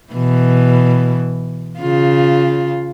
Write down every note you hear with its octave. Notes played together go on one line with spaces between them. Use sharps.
B2 E3
C#3 F4